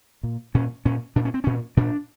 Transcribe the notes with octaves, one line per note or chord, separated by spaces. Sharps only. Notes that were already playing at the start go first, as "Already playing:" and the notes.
A#2
A#2 C#4
A#2 C#4
A#2 D4
C#4
C4
A#2 C#4
A#2 D4